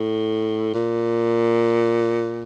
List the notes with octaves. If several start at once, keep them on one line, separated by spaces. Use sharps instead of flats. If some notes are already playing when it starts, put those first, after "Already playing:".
Already playing: A2
A#2